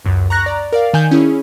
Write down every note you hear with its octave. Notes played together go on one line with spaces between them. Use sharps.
C#2 F#2
A#5 C#6 F#6 A#6
D5 A#5
A#4 D5 F5
D#3 G#5 G6
C#4 E4 G#4